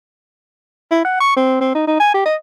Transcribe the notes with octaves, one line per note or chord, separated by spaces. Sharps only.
E4
F#5
C#6
C4
C4
D#4
D#4
G#5
G4
D#5